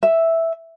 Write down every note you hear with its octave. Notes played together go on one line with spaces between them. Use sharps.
E5